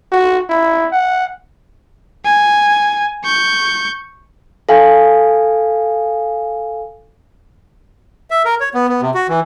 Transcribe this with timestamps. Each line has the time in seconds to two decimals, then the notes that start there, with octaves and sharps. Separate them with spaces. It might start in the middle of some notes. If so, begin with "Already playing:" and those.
0.12 F#4
0.50 E4
0.92 F#5
2.25 G#5
3.24 C#6 G6
4.69 A4 F5 G#5
8.31 E5
8.45 A#4
8.60 C#5
8.74 B3
8.89 B3
9.01 C3
9.14 F#4
9.29 E3